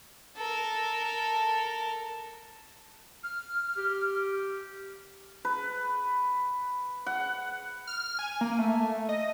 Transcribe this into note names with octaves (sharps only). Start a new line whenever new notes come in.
A4 A#4
F6
G4
B4
F#5
F6
G#5
A#3
A3
D#5